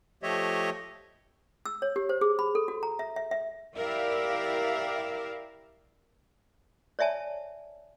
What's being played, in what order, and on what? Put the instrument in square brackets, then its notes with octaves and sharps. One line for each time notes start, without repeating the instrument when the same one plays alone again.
[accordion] F3 A3 G4 C#5 D#5 E5
[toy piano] E6
C#5
G4
C5
G#4
B5
A4
F#4
A#5
E5
E5
E5
[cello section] E4 G4 A#4 D5 E5 F5
[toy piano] C#5 D5 E5 G#5 A5